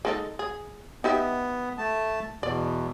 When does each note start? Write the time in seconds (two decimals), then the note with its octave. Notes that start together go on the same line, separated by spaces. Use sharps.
0.05 G#3 D#4 A4
0.39 G#4
1.04 B3 D#4 G4 E5
1.78 A3 A5
2.43 E2 B2 D5